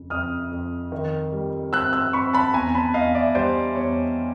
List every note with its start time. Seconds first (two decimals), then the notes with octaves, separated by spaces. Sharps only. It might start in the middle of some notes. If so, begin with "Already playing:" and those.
Already playing: F2 C#3
0.10 F2 D#6 F6
0.51 F2
0.92 D#3
1.32 G3
1.73 C4 E6 F#6
1.93 E6 F#6
2.13 C4 B5 C#6
2.33 A5 B5
2.54 E2 G#5 A#5
2.75 A5 B5
2.94 E2 D#5 F5
3.15 D5 E5
3.35 G3 C5 D5
3.76 E2 C#5